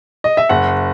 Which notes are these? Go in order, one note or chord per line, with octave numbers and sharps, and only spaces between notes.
D#5
E5
F#1 F#5